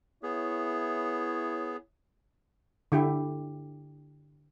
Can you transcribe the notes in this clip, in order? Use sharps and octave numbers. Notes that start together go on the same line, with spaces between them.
B3 E4 G#4 C#5
D3 E4 G4